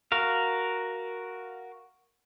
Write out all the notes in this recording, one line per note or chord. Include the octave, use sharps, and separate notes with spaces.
F#4 A#4 F5